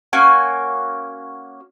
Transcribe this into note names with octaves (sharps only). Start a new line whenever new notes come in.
A#3 C#4 F#4 G#5